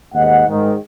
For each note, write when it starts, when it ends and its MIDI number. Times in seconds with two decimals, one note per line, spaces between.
0.13 0.43 39
0.13 0.43 44
0.13 0.43 75
0.13 0.43 78
0.48 0.72 44
0.48 0.72 51